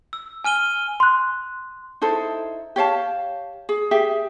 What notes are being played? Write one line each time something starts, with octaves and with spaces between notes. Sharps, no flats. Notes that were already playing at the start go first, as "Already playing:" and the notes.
E6
G#5 F6 D#7 G7
C6 F#6
D#4 E4 A4 C5
G4 C#5 F5 A5
G#4
G4 G#4 E5